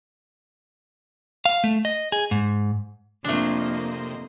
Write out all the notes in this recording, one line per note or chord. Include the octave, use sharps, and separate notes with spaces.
F5
A3
D#5
G#4
G#2
F2 C3 A3 A#3 D4 D#5 C6